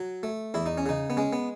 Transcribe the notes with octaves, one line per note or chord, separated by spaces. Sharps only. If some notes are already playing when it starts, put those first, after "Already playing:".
Already playing: F#3
A3
E2 E4
D#4
C#4
C#3 D#4
B3
G#3 C#4
B3